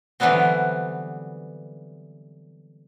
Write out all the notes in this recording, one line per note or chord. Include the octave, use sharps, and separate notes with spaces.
D3 E3 F#3 G3 B3 C4